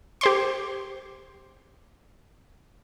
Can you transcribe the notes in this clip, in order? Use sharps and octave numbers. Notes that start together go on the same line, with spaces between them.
G4 C5 C6